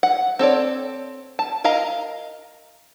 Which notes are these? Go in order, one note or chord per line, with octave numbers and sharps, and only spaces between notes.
F#5
C4 A4 C#5 D5
A5
A#4 D#5 F5 A#5